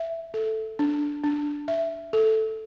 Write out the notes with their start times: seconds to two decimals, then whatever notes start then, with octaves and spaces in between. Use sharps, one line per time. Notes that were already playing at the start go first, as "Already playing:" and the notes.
Already playing: E5
0.34 A4
0.79 D4
1.24 D4
1.68 E5
2.13 A4